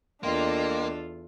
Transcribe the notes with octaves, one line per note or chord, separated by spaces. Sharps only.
E2 A#3 D4 F4 A4 D#5 G5 C6